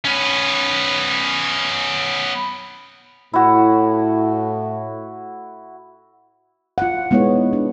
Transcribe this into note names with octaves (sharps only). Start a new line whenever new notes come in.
B3 C#4
A2 E4 F#4
F4 F#5
G#3 B3 D#4 E4 C#5
D4